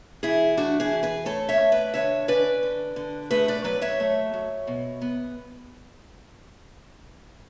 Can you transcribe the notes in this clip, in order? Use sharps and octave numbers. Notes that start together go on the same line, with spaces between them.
E3 E4 G#4
A3 D4 F#4
E4 G#4
E3
G#4 B4
A3 A4 C#5
C#5 E5
A3
B4 D5
D3 C#5 E5
C#4 B4 D5
D3
D3
A3 G#4 B4
B4 D5
F#3 B4 D5
C#5 E5
A3
F#3
B2
B3